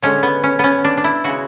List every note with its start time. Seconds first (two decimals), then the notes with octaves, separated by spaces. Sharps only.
0.02 D3 G#3 C#4
0.23 B3
0.43 C#4
0.59 B3 C#4
0.84 D4
0.97 D4
1.04 E4
1.24 C#3 G#3 F#4